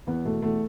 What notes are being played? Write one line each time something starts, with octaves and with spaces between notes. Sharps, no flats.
E2 B3
B2 A3
E2 A3